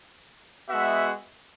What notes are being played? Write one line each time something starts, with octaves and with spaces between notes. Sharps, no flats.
G#3 B3 F#4 E5